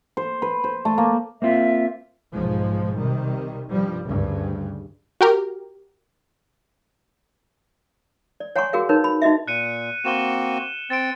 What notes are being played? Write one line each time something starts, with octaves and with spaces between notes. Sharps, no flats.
C5
B4
C5
A3
A#3
A#3 C4 F4 E5
B1 G#2 F3 G#3
C3 D#3 G3
G2 F3 G3
D2 G2 C#3
F#4 G4 A#4
D5
C#5 F#5 G#5 A#5 C6 C#6
F#4 G#4 A#4 F5
D#4 A#4 B4 C#5
B5
D#4 F#4 D#5 E5
A#2 F#6 C#7 D#7
A#3 C4 F#4 E7 G7
C4 A6 D7